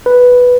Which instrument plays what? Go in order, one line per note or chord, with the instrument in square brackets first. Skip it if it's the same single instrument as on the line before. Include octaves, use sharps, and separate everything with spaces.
[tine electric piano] B4